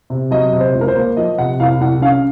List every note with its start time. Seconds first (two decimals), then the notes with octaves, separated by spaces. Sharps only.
0.10 C3
0.31 F#3 D#5
0.53 C3
0.60 C5
0.74 C#2
0.81 A#4
0.88 C5
0.96 A#3
1.17 F3 D#5
1.38 C3 F#5
1.60 C2 F5
1.81 C2 F#5
2.02 C#4 F5